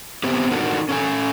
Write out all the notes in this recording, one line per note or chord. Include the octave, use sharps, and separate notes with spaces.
B3 C4 E4 G4
D4 D#4 F#4 A4 A#4
C#4 A4 G#5